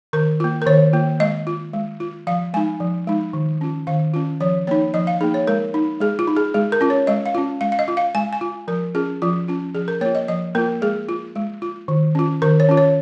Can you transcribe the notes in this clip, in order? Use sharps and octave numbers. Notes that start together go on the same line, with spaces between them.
D#3 A#4
A#3 F4
A#4
D#3 C#5
A#3 F4
G#3 D#5
F4
G#3
F4
F3 F5
G#3 D#4 G#5
F3
G#3 D#4
D#3
C#4 F4
D#3 F5
C#4 F4
F3 C#5
A#3 D#4 C#5
F3 D#5
F5
A#3 D#4 G#4
C#5
G#3 A#4
D#4
G#3 G#4
F4
D#4
G#4
G#3 G#4
A#4
C#4 F4
C#5
G#3 D#5
F5
C#4 F4
G#3 F5
F5
D#5
F4
F5
G#3 G#5
G#5
F4
F3 A#4
C#4 F4 G#4
F3 F4
C#4 F4
F3 G#4
A#4
A#3 F4 C#5
D#5
F3 D#5
A#3 F4 A#4
G#3 G#4
F4
G#3
F4
D#3
C#4 F4
D#3 A#4
C#5
C#4 F4
C#5